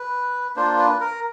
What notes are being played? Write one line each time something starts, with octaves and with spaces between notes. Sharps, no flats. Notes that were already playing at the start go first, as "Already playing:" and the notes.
Already playing: B4
A#3 D4 F4 C5
B4
A#4